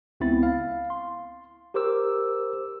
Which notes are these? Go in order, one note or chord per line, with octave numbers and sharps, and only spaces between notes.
C#2 B3 C4 E4 B5 A6
F5
C6
G4 A#4 C5 D6 E6